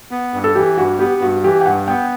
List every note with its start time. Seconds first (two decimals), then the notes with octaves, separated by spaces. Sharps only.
0.11 B3
0.34 G2
0.44 A4
0.55 E3 G4
0.78 G2 F#4
0.99 B3 G4
1.22 G2 F#4
1.43 E3 G4
1.61 G5
1.66 G2 F#5
1.88 B3 G5